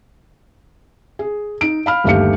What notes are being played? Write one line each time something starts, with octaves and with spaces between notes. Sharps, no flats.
G#4
D#4 D7
F5 B5 F6
G1 D#2 A3 G4 F5 C#7